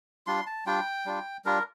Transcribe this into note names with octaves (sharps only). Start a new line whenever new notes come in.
G3 D4 F4 C6
A5
G3 D4 F4 G5
G3 D4 F4
G3 D4 F4 A#4